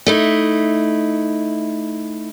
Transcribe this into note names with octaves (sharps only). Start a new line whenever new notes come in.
A3 D#4 E4